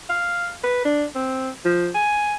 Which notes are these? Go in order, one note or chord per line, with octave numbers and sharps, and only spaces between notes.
F5
B4
D4
C4
F3
G#5